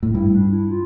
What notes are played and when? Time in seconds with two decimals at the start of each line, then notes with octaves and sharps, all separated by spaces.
0.03 A2
0.14 G2 E4
0.34 D4
0.51 E4
0.70 F4